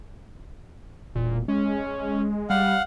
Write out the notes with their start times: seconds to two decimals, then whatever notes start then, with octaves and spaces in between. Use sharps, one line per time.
1.15 E1 A#2
1.48 G#3 C#4
2.50 G3 F5 F#5